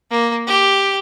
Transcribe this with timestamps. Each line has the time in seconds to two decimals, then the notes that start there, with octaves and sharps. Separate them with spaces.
0.11 A#3
0.47 G4